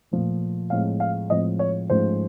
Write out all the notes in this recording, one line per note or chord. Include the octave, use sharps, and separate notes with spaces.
A#2 F3 A3
A2 F3 G#3 C4 F5
F5
A2 F3 G#3 C4 D#5
C#5
G#2 F3 A3 C#4 C5